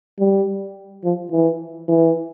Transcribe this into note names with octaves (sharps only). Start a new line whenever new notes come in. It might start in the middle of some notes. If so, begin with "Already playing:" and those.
G3
F3
E3
E3